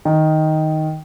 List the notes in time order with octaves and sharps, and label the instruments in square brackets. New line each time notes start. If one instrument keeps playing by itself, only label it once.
[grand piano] D#3